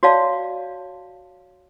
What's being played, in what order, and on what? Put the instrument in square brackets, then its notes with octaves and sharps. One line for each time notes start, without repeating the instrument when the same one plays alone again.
[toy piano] F#4 C#5 D5 F5 A5